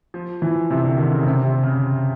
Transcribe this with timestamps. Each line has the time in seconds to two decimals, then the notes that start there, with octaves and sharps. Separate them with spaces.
0.14 F3
0.42 E3
0.70 C3
0.84 D3
0.98 D#3
1.12 C#3
1.26 C3
1.45 C3
1.63 C#3